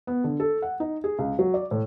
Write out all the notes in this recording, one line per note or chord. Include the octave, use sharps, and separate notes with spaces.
B3
D3
A4
F#5
D#4
G#4
C#2
F#3
D5
A2